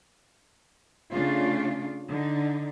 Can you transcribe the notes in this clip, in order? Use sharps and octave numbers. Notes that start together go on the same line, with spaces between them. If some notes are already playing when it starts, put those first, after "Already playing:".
C#3 A3 D4 F4
D3 D#4